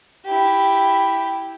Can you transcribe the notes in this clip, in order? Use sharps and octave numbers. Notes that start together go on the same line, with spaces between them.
E4 G4